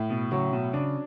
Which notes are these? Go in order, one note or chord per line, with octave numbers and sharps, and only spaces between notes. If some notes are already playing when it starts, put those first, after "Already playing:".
Already playing: A2
B2
C#3 F#3
B2
C#3 D4